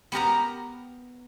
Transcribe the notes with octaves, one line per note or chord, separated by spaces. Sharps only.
B3 G4 A#4 A#5